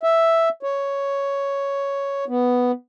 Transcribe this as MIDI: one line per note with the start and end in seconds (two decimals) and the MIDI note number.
0.03 0.49 76
0.63 2.25 73
2.29 2.72 59